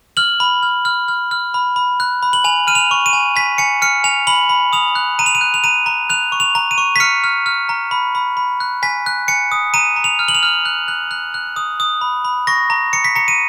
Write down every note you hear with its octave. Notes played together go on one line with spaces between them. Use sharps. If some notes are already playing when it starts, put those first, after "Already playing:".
F6 F#7
B5
F6
F6
F6
F6
B5
B5
F#6
B5
F#7
G#5 F7
F6 D#7
F7
C#6
D#7
G#5
G#5 B6
G#5 C#7
F6 C#7
G#5 F7
B5 F#7
B5
D#6 F7
F#6
A#5 D#7
F7
D#7
F#6
F7
A#5 D#7
A#5
F#6 F7
C#6
F7
A#5
D#7
C#6
B6
F6 C#7
F6
F6
A#5
B5
B5
B5
F#6
G#5 B6
F#6
G#5 C#7
D#6
A#5 D#7
A#5
F7
F6
F#7
F7
F6
F#6
F#6
F#6
F#6
D#6
D#6
B5
B5
C#6 A#6
A#5
A#5 C#7
B6
A#5 C#7
D#7